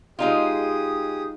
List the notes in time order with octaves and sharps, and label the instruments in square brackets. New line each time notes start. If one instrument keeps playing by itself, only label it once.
[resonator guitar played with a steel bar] G#3 D#4 F4 [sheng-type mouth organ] G4 G#4 D#6